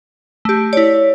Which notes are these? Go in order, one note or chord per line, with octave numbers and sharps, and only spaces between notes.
A3 G4
E4 C#5 D5